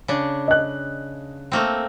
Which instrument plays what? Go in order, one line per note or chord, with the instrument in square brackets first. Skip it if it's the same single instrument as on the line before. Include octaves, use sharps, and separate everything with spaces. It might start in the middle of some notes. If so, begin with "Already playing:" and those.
[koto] C#3 D4
[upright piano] D#5 F#6
[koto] A3 A#3 C4